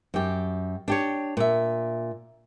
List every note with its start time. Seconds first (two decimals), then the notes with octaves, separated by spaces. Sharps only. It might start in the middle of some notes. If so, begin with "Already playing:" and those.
0.14 F#2 G4
0.88 D4 G4 C#5
1.37 A#2 E5